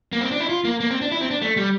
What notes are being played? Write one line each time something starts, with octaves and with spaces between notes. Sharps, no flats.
A#3
C4
D4
E4
F4
A#3
A#3
C4
D4
E4
C4
D4
A3
G3